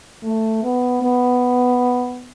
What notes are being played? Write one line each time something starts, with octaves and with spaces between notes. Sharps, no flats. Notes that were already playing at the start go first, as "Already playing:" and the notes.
A3
B3
B3